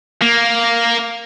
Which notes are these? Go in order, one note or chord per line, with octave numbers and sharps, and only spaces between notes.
A#3